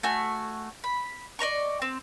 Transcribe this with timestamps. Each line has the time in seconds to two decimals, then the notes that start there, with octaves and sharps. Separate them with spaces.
0.03 A3 F#4 G#5
0.84 B5
1.39 D5 D#5 A#5 C#6
1.82 C4